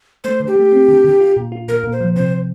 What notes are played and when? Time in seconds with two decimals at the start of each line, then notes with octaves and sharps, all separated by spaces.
0.24 A3 C5
0.40 D3
0.47 G4
0.56 A3
0.72 C4
0.88 D3
1.04 D3
1.20 F4
1.36 A#2
1.52 F4
1.68 A#2 A#4
1.84 A#2
1.92 C5
2.00 F3
2.16 C3 C5